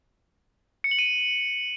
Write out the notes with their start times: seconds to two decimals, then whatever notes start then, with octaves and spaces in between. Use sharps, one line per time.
0.84 C#7
0.91 F#7
0.99 D#7